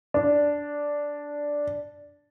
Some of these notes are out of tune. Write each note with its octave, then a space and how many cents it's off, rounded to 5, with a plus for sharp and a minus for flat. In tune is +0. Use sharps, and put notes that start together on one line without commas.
D4 -5